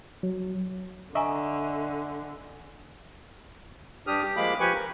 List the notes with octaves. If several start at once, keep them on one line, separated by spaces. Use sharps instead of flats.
F#3
D3 D#5 E5 G#5 A#5 C#6
G2 D4 G4 D#6 F6
G4
F3 G#3 A#3 F5 B5 D6
F3 G4 B4 G#5 C#6
A#4